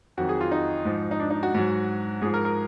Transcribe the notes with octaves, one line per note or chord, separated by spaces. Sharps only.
F2 D#3 F#3 F#4
G#4
F4
D#4
G#2 F3
D#4
D4
D#4
F#4
G#2 F#3
G#2 F3 G#4
A#4
A#4